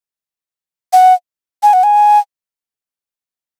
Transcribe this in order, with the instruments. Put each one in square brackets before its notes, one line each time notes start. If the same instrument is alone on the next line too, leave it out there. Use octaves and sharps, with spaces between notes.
[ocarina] F#5
G#5
F#5
G#5